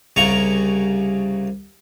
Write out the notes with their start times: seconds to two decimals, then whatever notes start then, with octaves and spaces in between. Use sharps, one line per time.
0.16 C2 C#3 A#5 C#6